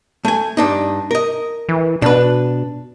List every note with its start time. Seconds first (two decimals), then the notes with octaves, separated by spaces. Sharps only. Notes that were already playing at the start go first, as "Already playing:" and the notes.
0.25 A3 G#5
0.57 G2 D4 D#4
1.11 A#4 D#5
1.69 E3
2.02 B2 D4 B4